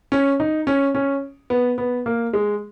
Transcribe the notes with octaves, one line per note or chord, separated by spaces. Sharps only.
C#4
D#4
C#4
C#4
B3
B3
A#3
G#3